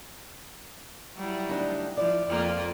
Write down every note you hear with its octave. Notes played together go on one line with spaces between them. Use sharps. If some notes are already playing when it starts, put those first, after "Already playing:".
F#3 G3 E4
D2 D4 D#4
F3 E4 D5
F2 A#3 F4